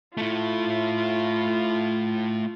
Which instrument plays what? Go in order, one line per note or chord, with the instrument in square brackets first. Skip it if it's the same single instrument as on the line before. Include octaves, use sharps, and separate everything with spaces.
[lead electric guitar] A3 E4 [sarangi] F4